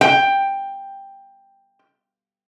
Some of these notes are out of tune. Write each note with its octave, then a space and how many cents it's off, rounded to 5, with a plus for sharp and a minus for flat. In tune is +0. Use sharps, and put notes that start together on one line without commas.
G5 +10